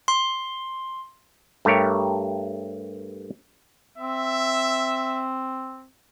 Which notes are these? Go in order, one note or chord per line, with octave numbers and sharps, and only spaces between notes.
C6
G2 A3 G4 A#4 C#5
C4 E5